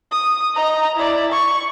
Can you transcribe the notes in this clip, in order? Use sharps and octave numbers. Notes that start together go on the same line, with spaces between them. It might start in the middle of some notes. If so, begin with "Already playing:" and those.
D#6
D#5 A#5
E4 D5
C#6